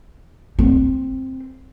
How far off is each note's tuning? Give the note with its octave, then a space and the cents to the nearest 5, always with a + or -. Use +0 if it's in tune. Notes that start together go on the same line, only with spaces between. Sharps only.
C4 +5